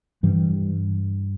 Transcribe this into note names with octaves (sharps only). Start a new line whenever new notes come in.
G2 E3 G3